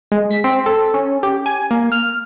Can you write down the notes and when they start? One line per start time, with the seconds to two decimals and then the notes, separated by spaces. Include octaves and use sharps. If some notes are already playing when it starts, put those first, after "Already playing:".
0.12 G#3
0.31 B6
0.44 C4
0.66 A4
0.94 C#4
1.23 G4
1.46 G#5
1.71 A#3
1.92 F6